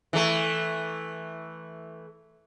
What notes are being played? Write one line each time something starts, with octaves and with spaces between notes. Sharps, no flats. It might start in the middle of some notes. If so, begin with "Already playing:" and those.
E3 A3